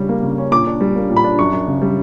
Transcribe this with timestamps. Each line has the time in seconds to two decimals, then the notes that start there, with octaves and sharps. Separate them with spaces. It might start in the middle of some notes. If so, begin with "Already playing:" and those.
Already playing: C#3 G3 C#4
0.09 A#3
0.23 C#3
0.38 C#4
0.51 A#2 D6
0.66 D4
0.81 G3
0.96 A#3
1.10 A#2
1.16 B5
1.24 D4
1.39 F#2 C#6
1.52 F#2
1.68 C#3
1.82 G3